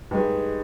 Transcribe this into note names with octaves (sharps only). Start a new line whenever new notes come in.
G2 G#3 D#4 G4